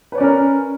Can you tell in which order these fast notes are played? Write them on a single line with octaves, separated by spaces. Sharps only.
B4 C#5 D5 C#4 A#4